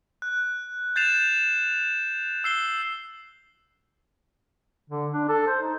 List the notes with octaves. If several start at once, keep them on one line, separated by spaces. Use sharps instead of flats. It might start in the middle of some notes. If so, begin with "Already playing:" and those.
F#6
G6 A6 C7 E7 F7
E6 C7 G7
D3
D4
A4
C5
D#4